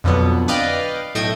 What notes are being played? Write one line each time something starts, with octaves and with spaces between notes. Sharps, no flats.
F2 B2 D3 F#3 B3
B4 D5 D#5 F5 G5
B1 A2 A3 D#5 G5 G#6